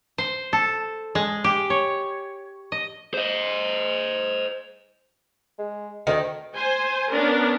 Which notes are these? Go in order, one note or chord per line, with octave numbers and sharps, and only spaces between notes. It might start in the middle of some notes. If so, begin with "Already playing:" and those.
C5
A4
G#3
G4
C#5
D#5
C5 D#5
G#3
D2 D#3
C5 G#5
B3 C#4 D4 A#4